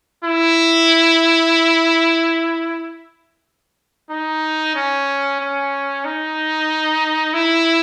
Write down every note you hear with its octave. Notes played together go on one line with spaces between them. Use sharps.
E4
D#4
C#4
C#4
D#4
E4